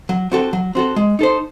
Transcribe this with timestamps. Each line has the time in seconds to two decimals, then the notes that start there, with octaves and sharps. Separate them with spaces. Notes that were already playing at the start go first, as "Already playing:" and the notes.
0.09 F#3
0.32 C4 F#4 A4
0.53 F#3
0.75 C4 F#4 A4
0.96 G#3
1.19 D#4 A4 C5